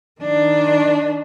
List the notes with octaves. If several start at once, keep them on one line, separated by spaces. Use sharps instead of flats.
D#3 D4